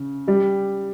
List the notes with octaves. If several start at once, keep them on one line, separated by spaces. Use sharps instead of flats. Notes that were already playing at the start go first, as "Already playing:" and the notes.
Already playing: C#3
G3 G4